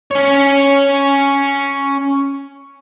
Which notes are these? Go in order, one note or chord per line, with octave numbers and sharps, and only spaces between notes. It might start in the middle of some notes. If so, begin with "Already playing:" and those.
C#4 C#5